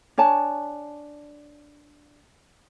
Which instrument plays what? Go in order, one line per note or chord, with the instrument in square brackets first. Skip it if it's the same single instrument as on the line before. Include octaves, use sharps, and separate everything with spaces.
[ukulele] D4 C#5 G#5 A5